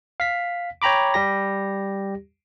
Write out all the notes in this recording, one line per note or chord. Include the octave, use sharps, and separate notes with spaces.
F5 B6
C#5 G5 A#5 B5 D6
G3 G4 A#6